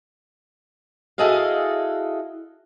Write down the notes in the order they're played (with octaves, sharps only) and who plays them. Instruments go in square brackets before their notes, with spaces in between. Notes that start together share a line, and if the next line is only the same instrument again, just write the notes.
[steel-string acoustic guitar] E4 F#4 G#4 A4 D#5 F5